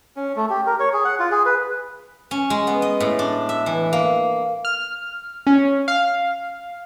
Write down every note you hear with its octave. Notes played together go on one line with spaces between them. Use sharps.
C#4
A3
G4
A#4
C#5
G#4
F#5
F4
G#4
B4
C#4
G#3
B3
D#5
A2
D4
E5
E3
A#3
F6
C#4
F5